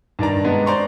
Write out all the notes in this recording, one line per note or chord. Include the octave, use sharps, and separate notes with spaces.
G2 D#3 D5 A#5
G#3 B3 D4
C5 D5 A#5 C6 C#6